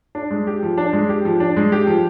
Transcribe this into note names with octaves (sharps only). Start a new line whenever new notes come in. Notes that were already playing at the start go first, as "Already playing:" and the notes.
D4
G#3
G4
F3
D4
G#3
G4
F3
D4
G#3
G4
F3